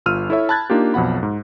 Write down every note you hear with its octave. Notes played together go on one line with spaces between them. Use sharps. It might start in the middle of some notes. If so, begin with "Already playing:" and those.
G1 F4 E6 F6 D#7
E4 A4 C#5 E5
A5 B5 F#6 G#6 A6
A#3 D4 D#4 F4 G4
B1 F2 B2 F#5 B5
G#2